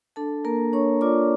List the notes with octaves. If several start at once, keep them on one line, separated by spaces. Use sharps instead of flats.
D4 A4 A5
A#3 A#4 A#5
D4 C#5 C#6
F4 D5 D6